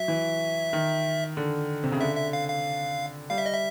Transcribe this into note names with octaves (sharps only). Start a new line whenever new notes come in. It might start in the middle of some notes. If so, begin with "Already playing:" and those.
Already playing: F#3 E5
E3
D#3
D3
C3
C#3
D3 E5
E5
F5
F5
G3 F5
E5
D#5
E5